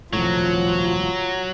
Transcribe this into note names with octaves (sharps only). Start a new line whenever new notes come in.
D#1 C2 A2 F3 F#3 F4